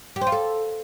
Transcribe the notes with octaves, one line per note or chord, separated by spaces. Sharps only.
G4
C5
F4
A4